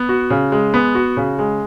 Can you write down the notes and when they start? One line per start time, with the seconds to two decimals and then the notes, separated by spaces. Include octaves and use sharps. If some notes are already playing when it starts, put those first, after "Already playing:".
Already playing: B3
0.09 F#4
0.30 C#3
0.52 G#3
0.74 B3
0.95 F#4
1.17 C#3
1.39 G#3